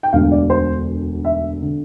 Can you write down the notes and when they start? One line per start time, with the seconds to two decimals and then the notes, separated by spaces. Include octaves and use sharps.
0.03 G5
0.13 E1 D2 D3 F5
0.32 D5
0.50 C5
1.25 E5
1.62 D3